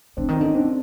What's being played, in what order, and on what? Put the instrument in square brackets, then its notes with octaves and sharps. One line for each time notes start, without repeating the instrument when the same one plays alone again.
[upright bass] D3 [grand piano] C4 D4
[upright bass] D#3
[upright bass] D3 [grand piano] C#4 D#4
[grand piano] C4 D4